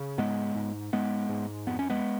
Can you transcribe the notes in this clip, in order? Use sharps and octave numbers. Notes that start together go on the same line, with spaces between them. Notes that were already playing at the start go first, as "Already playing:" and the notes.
Already playing: C#3
G#2 G#3 B3
G#2
G#2 G#3 B3
G#2
F2 B3
C#4
G#3 B3